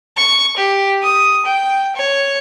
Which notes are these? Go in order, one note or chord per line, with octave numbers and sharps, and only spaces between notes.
C#6
G4
D#6
G5
C#5